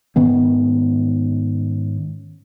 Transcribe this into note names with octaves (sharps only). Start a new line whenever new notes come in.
G#2 D#3 B3 C#4